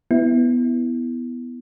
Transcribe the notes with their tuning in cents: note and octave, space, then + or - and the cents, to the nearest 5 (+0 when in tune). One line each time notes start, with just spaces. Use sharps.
B3 +0 E4 -5